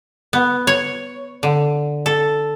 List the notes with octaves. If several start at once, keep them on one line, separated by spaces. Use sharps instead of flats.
B3
C#5
D3
A4